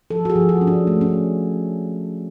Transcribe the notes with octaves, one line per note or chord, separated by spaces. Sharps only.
F3 A4
F#4
G#4
F3
F#4
C#4
D4
A3
C#4